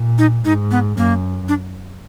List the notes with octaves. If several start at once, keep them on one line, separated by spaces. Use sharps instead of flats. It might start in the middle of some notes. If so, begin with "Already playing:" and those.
Already playing: A#2
D#4
G#2 D#4
B3
F#2 A#3
D4